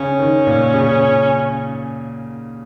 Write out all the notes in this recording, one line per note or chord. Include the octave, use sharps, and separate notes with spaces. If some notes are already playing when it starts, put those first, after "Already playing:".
Already playing: C#3 C#4
D#3
A#2
C#3